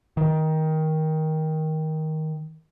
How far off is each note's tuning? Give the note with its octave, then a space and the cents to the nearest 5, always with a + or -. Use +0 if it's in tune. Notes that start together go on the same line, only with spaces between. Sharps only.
D#3 +15